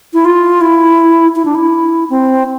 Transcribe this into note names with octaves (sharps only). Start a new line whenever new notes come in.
E4
F4
E4
E4
D4
E4
C4